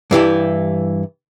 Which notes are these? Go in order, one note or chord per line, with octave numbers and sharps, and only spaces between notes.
G2 E3 E4 G4